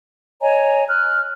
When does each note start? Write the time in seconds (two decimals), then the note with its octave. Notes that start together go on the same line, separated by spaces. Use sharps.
0.41 C#5 D#5 G#5 A#5
0.88 F6 F#6